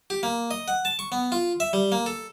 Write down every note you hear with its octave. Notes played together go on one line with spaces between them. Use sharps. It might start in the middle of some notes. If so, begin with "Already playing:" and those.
G4
A#3
D#5
F#5
A5
C#6
B3
F4
E5
G3
A#3
A4